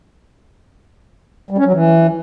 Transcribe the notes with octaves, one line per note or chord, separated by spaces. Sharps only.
G3
C#4
F#3
E3